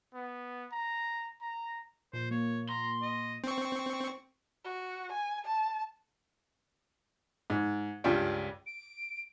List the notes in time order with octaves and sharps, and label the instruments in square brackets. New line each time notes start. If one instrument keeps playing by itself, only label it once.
[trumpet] B3
A#5
A#5
[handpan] A#2 [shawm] C5
[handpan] A#3 [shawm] C#5
[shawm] A#5 [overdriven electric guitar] C6
[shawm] D#5
[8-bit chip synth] C4 C#6
[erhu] F#4
G#5
A5
[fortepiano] G#2
C#2 G2 G3 D4 F4 G5
[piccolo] D7